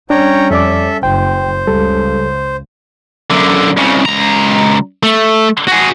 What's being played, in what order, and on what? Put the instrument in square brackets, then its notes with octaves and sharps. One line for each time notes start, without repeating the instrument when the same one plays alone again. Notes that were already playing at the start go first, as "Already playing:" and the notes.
[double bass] G3 C#4 [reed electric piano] D4 [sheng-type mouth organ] C#5 G5 A#5
[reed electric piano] F2 D5 D6 [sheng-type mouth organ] A4 E5
[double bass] F#1 [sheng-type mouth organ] C5 [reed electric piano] G5
[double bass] C#2 C#3 [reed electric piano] G3 A4
[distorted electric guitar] F#2 D3
C2 C#3
C#2 A#5
A3
F#4 G#4